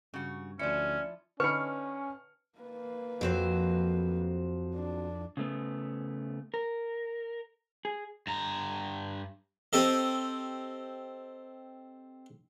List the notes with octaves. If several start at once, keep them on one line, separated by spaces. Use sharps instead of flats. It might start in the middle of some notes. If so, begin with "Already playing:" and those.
G2 C#3 F#4
D2 F3 C#4 E4 D5 C#7
D3 C#4 D#4 B4 B5 C#6 F6 C#7
A#3 B4
F2 F#3 C4 C5
D4
C#3 A3 B3
A#4
G#4
G2 A#5
C4 G4 A4 D#5